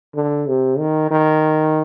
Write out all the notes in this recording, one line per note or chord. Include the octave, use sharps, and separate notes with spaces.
D3
C3
D#3
D#3